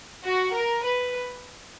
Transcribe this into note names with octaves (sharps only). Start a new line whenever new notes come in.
F#4
A#4
B4